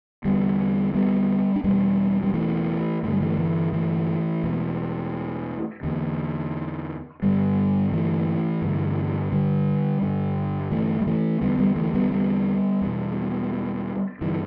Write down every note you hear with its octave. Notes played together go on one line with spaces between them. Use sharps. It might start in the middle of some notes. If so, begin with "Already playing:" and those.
E2 D3 G3 B3
G3 B3
D4
E2 B2 G3 B3
G3
E3 A3
G2 D3 A3
G3
E3 A3
E3
E3 A3
E2 B2
E2 D3
G2 D3 G3 B3
E3 A3
G2 D3
D3 G3
G2 D3
E3 A3
G3
E3 A3
E2 D3 G3 B3
G3 B3
E3 A3
G3 B3
G3 B3
E2 B2
G2 D3 E3